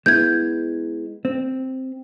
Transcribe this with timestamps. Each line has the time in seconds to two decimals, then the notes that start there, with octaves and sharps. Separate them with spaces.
0.06 G#3 B3 E4 G6 G#6
1.25 C4